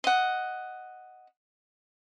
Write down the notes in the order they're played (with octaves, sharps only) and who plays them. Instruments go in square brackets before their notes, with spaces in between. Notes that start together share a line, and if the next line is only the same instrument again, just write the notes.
[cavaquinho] D#5 F#5